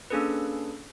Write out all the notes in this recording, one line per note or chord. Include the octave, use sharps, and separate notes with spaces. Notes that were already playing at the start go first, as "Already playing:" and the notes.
A#3 C#4 D4 G#4 A4 B4